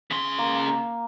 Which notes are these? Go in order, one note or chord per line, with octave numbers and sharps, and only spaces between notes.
C#3 C6
A#3
A#3